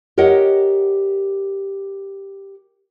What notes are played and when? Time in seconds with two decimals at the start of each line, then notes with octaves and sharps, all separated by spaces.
0.18 G4 A#4 C#5 D#5 F#5